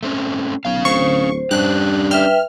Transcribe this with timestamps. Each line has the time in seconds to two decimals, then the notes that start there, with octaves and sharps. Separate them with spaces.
0.03 A3 C4 C#4
0.65 B1 C#4 F5
0.85 D1 C5 C#6
1.51 G2 C#4 D4 G4 F#6
2.11 B4 E5 G5 F6